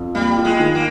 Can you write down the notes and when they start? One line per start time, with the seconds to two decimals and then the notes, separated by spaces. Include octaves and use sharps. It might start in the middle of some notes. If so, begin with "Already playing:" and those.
Already playing: F2
0.15 G3 A#3
0.37 F4
0.45 G#3
0.60 D#3
0.75 A#3